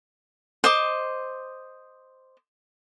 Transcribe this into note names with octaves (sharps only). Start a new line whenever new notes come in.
C5 D#5 D6